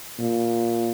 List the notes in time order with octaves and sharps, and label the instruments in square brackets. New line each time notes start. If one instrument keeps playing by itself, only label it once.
[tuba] A#2